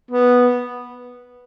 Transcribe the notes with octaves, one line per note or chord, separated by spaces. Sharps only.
B3